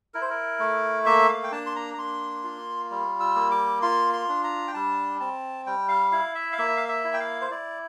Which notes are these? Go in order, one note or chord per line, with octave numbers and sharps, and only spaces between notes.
E4 A#4
C5
A#4
A3
A#3 E5
F5
G5
D4 A5
C6
A#5
A#5
A#3 C6
F4
G3
E6
A#3
D6
F4 C6
C6
D4
A#5
G5
G3 A5
C4 A5
G3 G5
F5
E4 F5
E5
F5
A#3 E5
F5
E5
E4
G5
F5
C5
E4 D5